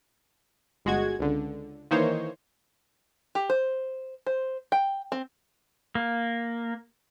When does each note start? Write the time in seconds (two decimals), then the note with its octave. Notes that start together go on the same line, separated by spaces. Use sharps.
0.85 G1 G#3 F#4 G#6
1.19 C#2 D3
1.91 D#3 E3 A#3 D#4 C5 C#5
3.35 G4
3.50 C5
4.27 C5
4.72 G5
5.12 C4
5.95 A#3